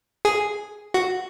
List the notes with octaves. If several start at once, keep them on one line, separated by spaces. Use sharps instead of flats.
G#4
F#4